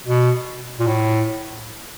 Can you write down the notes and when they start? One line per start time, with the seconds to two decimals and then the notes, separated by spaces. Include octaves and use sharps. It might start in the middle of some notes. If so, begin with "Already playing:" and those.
0.06 B2
0.80 A#2
0.87 A2